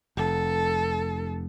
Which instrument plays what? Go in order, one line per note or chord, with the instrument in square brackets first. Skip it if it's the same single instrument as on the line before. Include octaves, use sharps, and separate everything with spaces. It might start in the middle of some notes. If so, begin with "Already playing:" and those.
[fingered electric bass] F1 [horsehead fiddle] A4